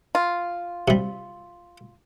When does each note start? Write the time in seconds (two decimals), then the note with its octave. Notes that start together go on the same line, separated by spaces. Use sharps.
0.15 F4
0.88 C3 G3